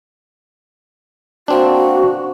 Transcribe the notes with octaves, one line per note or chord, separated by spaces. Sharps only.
A#3 C4 D4 F#4